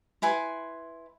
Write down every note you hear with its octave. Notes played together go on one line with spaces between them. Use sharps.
E4 B4 G#5 C6